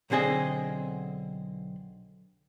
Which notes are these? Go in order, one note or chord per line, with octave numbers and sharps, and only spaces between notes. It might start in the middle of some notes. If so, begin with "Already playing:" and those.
B1 D3 C4 G#4 D#5